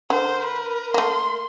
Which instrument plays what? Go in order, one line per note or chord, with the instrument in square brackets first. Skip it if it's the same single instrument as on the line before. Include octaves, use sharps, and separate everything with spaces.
[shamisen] D3 [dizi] A#4 [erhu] C5
[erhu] B4
[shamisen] A3 A#3 [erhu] C6